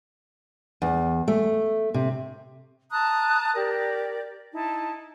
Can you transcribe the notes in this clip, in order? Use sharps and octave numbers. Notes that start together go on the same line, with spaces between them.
E2
A3
C3
A5 A#5 D#6 F#6
G4 A#4 D5
D#4 E4 A5